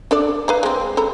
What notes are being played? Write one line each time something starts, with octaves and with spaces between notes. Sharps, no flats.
D4 A4 D5
B4 F5 A#5
G#3 C4
A4 A#5 B5